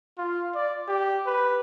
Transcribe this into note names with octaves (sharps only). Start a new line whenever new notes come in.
F4
D5
G4
B4